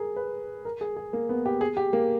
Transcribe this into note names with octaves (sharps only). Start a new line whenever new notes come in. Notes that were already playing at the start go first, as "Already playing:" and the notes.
Already playing: G#4 A#4
B4
A#4
G#4
G#4
A#3
B3
G4
G#4
G4
A#3